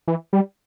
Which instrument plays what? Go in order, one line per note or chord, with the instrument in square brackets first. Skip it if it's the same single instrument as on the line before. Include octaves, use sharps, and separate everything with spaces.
[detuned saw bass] E3
G3